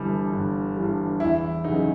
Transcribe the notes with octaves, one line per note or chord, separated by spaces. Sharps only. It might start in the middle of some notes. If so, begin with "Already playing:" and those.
Already playing: G1 G2 E3 G3
G1
G2 E3 G3
E2 E4
C#3 F#3 D#4